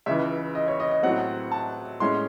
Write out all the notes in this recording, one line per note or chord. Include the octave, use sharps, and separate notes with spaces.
C#2 C#3 E3 E5
D#5
C#5
D#5
D#5
A2 F#3 C4 F#5
A5
A2 G#3 C#4 C6